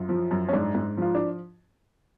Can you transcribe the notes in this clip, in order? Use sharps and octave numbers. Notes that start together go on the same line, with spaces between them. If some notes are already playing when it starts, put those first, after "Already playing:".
Already playing: F#2 F4
F3
F#2
C#4
G#2 D4
G#2
F3 F4
D4